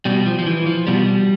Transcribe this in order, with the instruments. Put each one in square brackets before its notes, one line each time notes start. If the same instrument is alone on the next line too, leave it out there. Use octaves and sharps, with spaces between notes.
[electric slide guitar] B2 G3
F3
F3
E3
F3
B2 G3